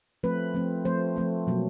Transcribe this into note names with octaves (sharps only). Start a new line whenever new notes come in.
F3 A3 C4 B4
F3 A3 C4
F3 A3 C4 C5
F3 A3 C4
B2 F#3 A#3